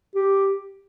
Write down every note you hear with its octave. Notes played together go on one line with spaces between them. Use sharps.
G4